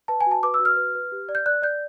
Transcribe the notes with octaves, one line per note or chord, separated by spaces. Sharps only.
B4 A5
G#5
F#4 A5
B4 D6
E6
F#4
F6
B4
B4
G4
D5
G6
D5 F#6
D5 G6